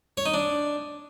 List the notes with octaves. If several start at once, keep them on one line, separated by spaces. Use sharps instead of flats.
C#5
D#4
D4